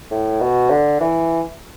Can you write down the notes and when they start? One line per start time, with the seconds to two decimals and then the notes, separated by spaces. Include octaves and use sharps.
0.11 A2
0.41 B2
0.70 D3
1.01 E3